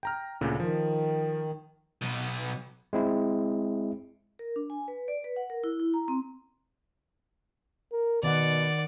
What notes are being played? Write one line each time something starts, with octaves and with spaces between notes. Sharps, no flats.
G5 A#5 F6
D2 A#2 C#3
D#3 F3
B1 B2
G#3 C4 E4
A#4
D4
G#5
B4
D5
B4
F#5
A#4
E4
E4
A#5
C4
A#4
B2 D#3 D5 F#5